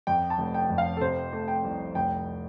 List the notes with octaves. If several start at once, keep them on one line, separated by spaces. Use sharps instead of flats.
F2 G5
A5
F1
G5
F2
F5
A4
C3 C5
A3
G5
C2
F1 G5